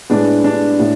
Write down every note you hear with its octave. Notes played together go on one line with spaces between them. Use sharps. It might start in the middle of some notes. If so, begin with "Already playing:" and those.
A2 G#3 B3 D4
D4
A2